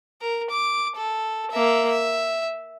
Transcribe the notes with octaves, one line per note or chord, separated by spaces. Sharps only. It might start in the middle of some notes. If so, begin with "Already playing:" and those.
A#4
D6
A4
A#3 E5
E5